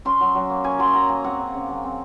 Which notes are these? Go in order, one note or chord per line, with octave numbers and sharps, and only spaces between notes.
C#4 C6
F#3
F#3
A#3
C#4 G#5
F#3 C6
F#3 A#5
A#3 G#5
C4 F#5
C#3
C#3
F#3
C4